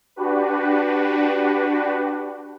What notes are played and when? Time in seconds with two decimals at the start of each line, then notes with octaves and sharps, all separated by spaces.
0.16 D4 F#4 G4 B4